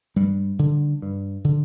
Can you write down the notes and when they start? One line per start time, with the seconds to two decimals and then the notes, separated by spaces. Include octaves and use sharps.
0.16 G2 G3
0.59 D3
1.02 G2
1.44 D3